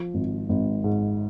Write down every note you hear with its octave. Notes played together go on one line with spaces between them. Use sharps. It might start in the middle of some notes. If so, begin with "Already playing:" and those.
Already playing: F3
G#1
G#1
G#2